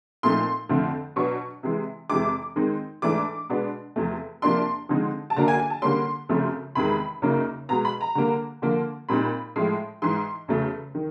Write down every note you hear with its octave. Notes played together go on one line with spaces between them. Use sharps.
A#2 F3 A3 C4 D#4 C6
F2 D3 F3 A3 C4
B2 F#3 B3 D4 C#6
C3 E3 G#3
F2 C3 E3 G#3 D6
D#3 G#3 C4 D#4
G#2 E3 A3 D4 D6
B2 G#3 B3 D4
E2 C3 F3 A3
C3 F3 A#3 D4 C6
D3 F3 G#3 C4 D#4
A5
F#2 D3 F#3 A#3 D4 A#5
G#5
G#5
A5
D3 G3 A#3 C#4 C6
F#2 C#3 F3 A3 C4
E2 C3 D#3 G#3 B5
F#2 C#3 F#3 A#3 D#4
B2 G#3 B3 A#5
B5
A#5
D3 G3 A#3
D3 F3 A#3
A#2 G3 C4 D#4 B5
A2 F3 G#3
G#2 E3 G#3 C6
E2 C#3 F#3 A3
D#3